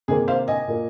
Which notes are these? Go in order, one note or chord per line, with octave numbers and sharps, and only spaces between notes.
C3 D#3 A#3 G#4
C5 F5
D#5 G#5
A#2 A#3